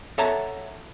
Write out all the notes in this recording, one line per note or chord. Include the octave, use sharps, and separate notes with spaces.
A4 C#5 E5 F#5 A5 A#5